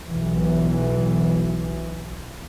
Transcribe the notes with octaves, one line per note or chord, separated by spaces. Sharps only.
B1 E3